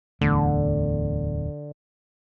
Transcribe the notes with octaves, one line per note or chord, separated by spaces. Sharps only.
D1 E2 D3 A3